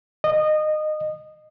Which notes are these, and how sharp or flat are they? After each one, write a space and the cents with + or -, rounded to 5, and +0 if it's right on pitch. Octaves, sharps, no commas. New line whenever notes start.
D#5 -20